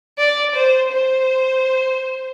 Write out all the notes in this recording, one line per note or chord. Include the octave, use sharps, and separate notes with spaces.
D5
C5
C5